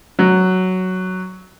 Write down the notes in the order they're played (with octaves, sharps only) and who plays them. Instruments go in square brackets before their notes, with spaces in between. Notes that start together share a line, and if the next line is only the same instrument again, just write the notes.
[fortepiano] F#3